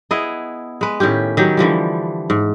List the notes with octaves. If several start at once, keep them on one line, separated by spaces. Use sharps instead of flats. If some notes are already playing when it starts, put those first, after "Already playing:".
B3 E4 G#4 D#5
G#3 B4
A2 D#3 C#4 G4
D#3 F#3 G4
D3 E3 F3 G3
G#2